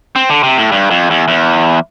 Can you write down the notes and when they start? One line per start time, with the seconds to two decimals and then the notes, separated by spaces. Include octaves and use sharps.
0.16 C4
0.30 D3
0.43 C3
0.58 A2
0.72 G2
0.91 F2
1.10 E2
1.28 E2